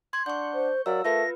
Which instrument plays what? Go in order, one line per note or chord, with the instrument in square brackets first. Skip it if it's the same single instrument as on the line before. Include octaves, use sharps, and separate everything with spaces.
[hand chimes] C6 [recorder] G#6
[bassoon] D4 [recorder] F#5 [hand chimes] C#6 G6
[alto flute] C5
[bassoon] F#3 [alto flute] A#4 [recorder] D5 [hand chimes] F5 E6
[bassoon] A3 [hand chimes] F4 B4 [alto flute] A#4 [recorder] A#6